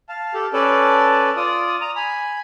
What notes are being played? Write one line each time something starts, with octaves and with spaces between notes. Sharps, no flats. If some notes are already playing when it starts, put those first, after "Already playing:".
F5 A5
G4 A4
C#4 A4 B4 D5 A5
F4 D5 D#6
A#5 D#6
G#5 B5